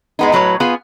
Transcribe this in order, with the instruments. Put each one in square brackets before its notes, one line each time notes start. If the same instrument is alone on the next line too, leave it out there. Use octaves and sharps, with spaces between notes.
[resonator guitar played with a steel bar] G#3 B3 D#4
A2 F#3 B4 C#5
B3 F4 G#4